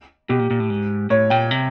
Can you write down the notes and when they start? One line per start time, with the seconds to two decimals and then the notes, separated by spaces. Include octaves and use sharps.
0.29 B2 G4
0.39 A#2
0.51 A#2
0.60 A2
0.70 G#2
1.10 A2 C#5
1.30 A#2 G5
1.51 C3